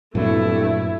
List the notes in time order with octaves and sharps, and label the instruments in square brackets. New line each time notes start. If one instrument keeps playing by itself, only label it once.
[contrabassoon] C2 [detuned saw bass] G2 [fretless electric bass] A#2 F#3 [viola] A3 E4